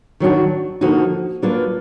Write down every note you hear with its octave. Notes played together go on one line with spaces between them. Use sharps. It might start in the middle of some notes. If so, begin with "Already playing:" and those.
D#3 F#3 D4 F#4
D3 F3 A#3 D#4 F#4
F#3 A#3 D4 F4 B4